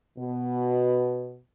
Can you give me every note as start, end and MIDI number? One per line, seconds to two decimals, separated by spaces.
0.18 1.38 47